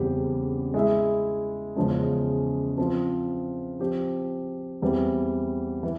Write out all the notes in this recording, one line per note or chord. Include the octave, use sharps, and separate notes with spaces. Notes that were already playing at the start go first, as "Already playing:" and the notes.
Already playing: E2 C#3 G3 C4 G4
G#3 E4 G#4 E5
E2 C#3 F3 G#3 C#4
F3 C4 F4
F3 C4 G4
E2 E3 G3 C4 G4
E3